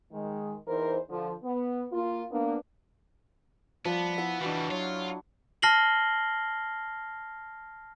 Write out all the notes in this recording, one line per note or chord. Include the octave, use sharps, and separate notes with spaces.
D#3 G#3
E2 E3 D#4 A#4 C5
D3 F3
B3
A#3 F4
A#3 B3 D4
F3 G3 B3 D6
E4 F#5
C#3 E3 G3 D4 E4 F#4
F#3 F4
A5 F6 A#6 C7 F#7 G7